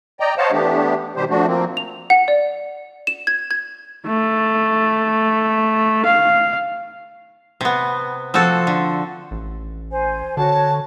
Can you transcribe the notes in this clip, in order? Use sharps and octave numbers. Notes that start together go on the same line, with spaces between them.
D5 D#5 G5 A#5
C5 C#5 D#5 F5 F#5 A5
E3 A3 B3 D4 G4
B2 D#3 G3 G4 C5
F3 A3 D4 F#4
F3 A#3 C4
F7
F#5
D5
E7
G#6
G#6
A3
F5
C3 B3
F3 C4 F#4 A4
D3
A1
C5 G#5
D3 F#4 C#5 A5